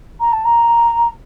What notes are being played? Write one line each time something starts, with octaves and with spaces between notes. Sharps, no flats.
A#5
A5
A#5